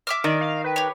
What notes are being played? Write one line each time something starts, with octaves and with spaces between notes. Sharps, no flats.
E5 D6 F6
D#3 D5 D#5
F5
B4 G5
G4 C#5